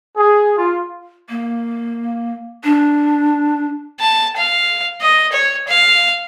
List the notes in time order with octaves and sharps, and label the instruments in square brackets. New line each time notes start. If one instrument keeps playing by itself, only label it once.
[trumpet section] G#4
F4
[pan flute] A#3
D4
[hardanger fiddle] A5
F5
D#5
C#5
F5